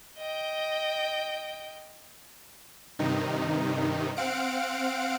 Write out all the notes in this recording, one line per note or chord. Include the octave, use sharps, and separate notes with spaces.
D#5 G5
G2 C3 D#3 D#4
C4 F5 F#5 D7